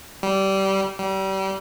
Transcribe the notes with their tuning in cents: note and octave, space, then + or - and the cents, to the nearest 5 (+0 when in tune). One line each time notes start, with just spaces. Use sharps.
G3 -20
G3 -30